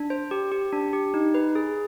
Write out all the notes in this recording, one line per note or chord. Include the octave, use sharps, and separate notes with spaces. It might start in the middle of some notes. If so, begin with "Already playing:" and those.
Already playing: D4
C5
G4
G4
D4
G4
D#4
B4
G#4